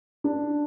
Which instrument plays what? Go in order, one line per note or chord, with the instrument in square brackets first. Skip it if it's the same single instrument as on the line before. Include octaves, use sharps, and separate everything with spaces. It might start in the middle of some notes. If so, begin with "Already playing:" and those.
[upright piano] D4